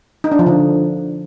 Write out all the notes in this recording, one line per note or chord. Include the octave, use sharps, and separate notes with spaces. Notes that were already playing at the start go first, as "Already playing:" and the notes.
D#4
D4
F3
D3